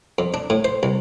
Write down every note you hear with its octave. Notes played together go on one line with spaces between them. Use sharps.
F2
D4
A2
C5
C2